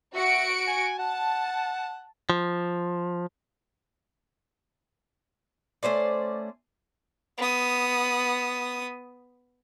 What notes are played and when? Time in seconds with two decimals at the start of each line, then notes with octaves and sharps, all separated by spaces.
0.15 F#4 E5 C#7 D7
0.67 G#5
0.99 F#5 A5
2.30 F3
5.83 A3 C#4 C5 D5
7.38 B3 D#6